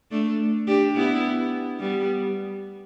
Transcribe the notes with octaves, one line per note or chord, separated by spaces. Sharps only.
A3 D4
D4 G4
B3 E4
G3 B3